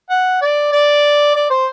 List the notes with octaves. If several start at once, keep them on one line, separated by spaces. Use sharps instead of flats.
F#5
D5
D5
D5
C5